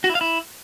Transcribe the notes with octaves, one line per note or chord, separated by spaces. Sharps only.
F#4
E4
F5
E4